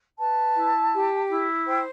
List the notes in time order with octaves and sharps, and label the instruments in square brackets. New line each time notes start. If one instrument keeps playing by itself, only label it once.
[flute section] B4 A5
E4
G4
E4
C5 G5